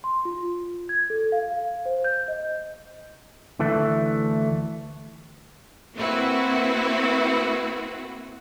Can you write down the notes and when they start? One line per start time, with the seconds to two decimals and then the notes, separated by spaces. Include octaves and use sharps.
0.04 C6
0.25 F4
0.89 G#6
1.10 A4
1.32 F5
1.86 C5
2.04 G6
2.28 D#5
3.60 D2 E3 A3
5.96 A#3 C4 E4 F#4 B4